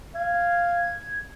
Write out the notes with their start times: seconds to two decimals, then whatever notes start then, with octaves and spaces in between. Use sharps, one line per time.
0.15 F5 G#6